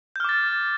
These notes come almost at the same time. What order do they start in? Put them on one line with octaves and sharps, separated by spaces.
G6 F6 D6 A6